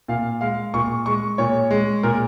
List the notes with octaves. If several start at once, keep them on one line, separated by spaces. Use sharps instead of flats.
A#2 F5
G#3 F5
A#2 C#6
G#3 C#6
A#2 C#5
G#3
A#2 A#4